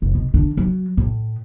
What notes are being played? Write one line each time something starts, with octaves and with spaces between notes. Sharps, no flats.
F1
B2
D3
F#3
A2